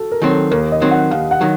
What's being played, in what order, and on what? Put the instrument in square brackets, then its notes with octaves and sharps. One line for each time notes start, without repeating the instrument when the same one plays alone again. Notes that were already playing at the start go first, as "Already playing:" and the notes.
Already playing: [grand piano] F#4 A4
A#4
[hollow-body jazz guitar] D#3 F#3 C4
[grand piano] A4
[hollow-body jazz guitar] D#2 [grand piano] A#4
[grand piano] D#5
[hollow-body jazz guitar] D#3 F#3 C4
[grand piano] F#5
[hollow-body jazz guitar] D#2 [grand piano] F5
[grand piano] F#5
[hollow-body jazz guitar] D#3 F#3